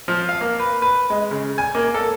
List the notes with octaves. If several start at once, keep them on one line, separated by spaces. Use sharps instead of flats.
F3
F5
A#3
B4
B4
G#3
C#3
G#5
A#3
A4